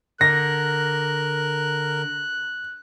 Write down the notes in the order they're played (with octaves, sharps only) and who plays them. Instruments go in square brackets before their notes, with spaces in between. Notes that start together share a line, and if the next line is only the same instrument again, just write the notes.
[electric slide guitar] D3 [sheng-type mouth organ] A#4 [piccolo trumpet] F#6 [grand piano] A#6